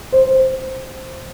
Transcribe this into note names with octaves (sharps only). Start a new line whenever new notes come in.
C5